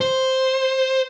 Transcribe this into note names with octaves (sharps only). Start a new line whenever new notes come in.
C5